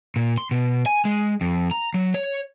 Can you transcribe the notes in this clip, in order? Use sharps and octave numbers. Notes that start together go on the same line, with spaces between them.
A#2
C6
B2
G#5
G#3
F2
A#5
F#3
C#5